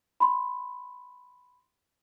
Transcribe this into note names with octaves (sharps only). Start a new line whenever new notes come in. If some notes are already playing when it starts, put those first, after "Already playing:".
B5 C6